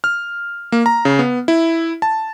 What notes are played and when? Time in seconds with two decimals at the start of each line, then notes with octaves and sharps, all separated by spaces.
0.04 F6
0.72 A#3
0.86 A#5
1.05 C#3
1.19 B3
1.48 E4
2.02 A5